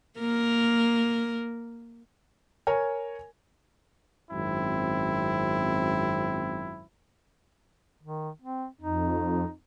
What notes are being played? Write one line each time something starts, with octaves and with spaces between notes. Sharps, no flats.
A#3 A#4
A#4 C#5 G#5
G#1 F#2 C4 E4
D#3
C4
F2 D#4